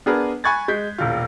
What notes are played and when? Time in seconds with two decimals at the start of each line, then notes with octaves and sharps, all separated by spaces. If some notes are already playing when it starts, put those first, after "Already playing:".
0.06 B3 D4 G#4 A#4 B4
0.44 G#5 B5 C#6 F#6 G#6 A6
0.68 G#3 G6 B6
0.98 E1 A#1 F4